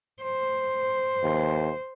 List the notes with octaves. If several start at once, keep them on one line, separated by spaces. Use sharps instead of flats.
C5
D#2